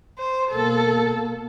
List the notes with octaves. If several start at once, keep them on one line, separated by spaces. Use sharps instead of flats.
C5
B2 A#3 A4